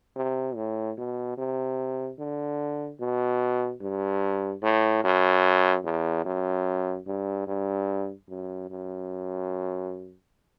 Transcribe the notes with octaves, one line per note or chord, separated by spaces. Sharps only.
C3
A2
B2
C3
D3
B2
G2
A2
F#2
E2
F#2
G2
G2
F#2
F#2